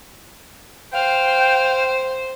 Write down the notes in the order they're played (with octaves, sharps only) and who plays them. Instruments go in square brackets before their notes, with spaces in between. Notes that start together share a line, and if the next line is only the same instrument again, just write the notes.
[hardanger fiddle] C5 [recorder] F5 [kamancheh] G5